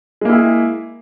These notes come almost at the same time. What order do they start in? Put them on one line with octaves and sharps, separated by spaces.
G#3 A#3 E4 G#4